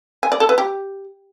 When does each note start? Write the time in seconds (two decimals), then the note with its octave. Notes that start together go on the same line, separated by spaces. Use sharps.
0.23 G#5
0.32 D5
0.40 A4
0.49 B4
0.58 G4